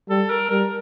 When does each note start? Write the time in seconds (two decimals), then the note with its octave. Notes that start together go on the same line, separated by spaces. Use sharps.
0.09 G3 A4
0.30 A#4
0.49 G3 A#4